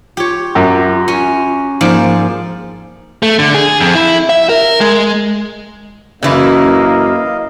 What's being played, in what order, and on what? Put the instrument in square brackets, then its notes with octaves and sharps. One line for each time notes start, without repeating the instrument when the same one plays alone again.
[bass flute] F4 [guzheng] G4 C#5
[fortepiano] F#2
[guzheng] C#4
[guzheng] G#2 F3 D5 [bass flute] A#3
[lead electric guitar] A3
D3
G#4
F2
E4
E5
A#4
G#3
[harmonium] F#2 [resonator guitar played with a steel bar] C#3 E3 E4 [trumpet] A#3 [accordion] D#5 F5